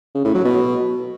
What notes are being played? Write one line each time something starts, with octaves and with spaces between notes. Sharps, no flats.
C#3
A2
F#3
B2